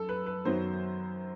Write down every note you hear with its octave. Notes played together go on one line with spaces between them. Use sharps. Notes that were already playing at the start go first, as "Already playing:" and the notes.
Already playing: F#2 A4
B4
B4
F#2 D#3 F#3 B3 C5